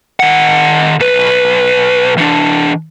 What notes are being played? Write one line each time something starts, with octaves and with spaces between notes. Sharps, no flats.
D#3 F#5
B1 B4
E3 D4